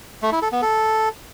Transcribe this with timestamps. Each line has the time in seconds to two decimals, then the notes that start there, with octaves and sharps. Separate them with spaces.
0.22 A3
0.32 E4
0.42 A4
0.52 B3
0.62 A4